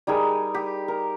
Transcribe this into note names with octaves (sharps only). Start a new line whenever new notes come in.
G3 D#4 G#4 A#4
G4
A#4